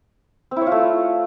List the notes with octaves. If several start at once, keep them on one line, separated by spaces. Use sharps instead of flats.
C4
E4
C#5
F4
A3